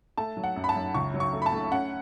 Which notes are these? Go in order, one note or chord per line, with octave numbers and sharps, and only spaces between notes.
A3 A5
F#3
F#5
F#2
B5
A5
F#2
C#2 C#6
F#3
C#6
A3
B5
A5
A3
C#4 F#5